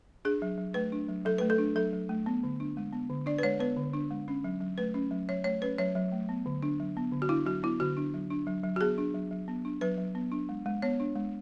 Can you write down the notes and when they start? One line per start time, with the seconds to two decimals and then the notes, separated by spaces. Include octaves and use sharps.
0.25 D4 G#4
0.42 F#3
0.58 F#3
0.74 A3 B4
0.92 D4
1.08 F#3
1.25 F#3 A4
1.38 A3 B4
1.50 A4
1.58 D4
1.75 F#3 A4
1.93 F#3
2.09 A3
2.26 B3
2.43 D3
2.60 D4
2.77 G#3
2.93 B3
3.10 D3
3.26 D4 D5
3.39 B4
3.43 G#3 C#5
3.60 B3 B4
3.76 D3
3.94 D4
4.11 G#3
4.28 C#4
4.44 F#3
4.61 F#3
4.78 A3 B4
4.94 C#4
5.11 F#3
5.29 F#3 C#5
5.44 A3 C#5
5.62 C#4 B4
5.78 F#3 C#5
5.95 F#3
6.12 A3
6.29 B3
6.46 D3
6.63 D4
6.80 F#3
6.97 B3
7.12 D3
7.22 F#4
7.29 D4 E4
7.46 F#3 F#4
7.63 B3 E4
7.80 D3 F#4
7.97 D4
8.14 F#3
8.30 D4
8.47 F#3
8.64 F#3
8.76 F#4
8.81 B3 G#4
8.98 D4
9.14 F#3
9.31 F#3
9.48 B3
9.65 D4
9.81 F#3 B4
9.98 F#3
10.15 B3
10.32 D4
10.49 G#3
10.66 G#3
10.82 B3 C#5
11.00 D4
11.15 G#3